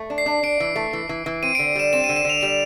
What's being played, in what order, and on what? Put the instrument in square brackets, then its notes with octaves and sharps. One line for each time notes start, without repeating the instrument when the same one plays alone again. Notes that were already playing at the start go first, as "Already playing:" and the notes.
Already playing: [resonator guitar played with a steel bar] A3
D4
[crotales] C7
[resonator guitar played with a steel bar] D4
[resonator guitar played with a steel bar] D4 [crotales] D7
[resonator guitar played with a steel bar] E3
A3
E3
E3
E3
[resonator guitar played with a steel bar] C4 [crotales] D#7
[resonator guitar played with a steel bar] D3 [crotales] D7
[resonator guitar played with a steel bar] G3 [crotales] E7
[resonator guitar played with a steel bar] C4 [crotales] E7
[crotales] D#7
[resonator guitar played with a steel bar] D3
[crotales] E7
[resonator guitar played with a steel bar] D3 [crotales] F7
[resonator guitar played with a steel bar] G3 [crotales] E7